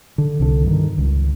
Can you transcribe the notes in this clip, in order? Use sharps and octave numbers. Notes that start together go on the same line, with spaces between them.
D3
C2 D3
G2 D#3
C#2